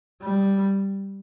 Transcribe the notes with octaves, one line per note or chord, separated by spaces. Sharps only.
G3